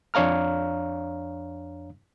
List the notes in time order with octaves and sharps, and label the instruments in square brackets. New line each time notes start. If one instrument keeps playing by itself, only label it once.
[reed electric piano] F2 D4 C#5 F5 A#5 F6